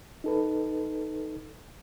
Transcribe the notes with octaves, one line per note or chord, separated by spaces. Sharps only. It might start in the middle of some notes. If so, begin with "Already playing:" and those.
D#4 A4 B4